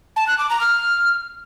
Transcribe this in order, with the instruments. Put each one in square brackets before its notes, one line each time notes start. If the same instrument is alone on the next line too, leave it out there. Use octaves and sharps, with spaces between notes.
[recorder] A5
F#6
D6
A#5
F6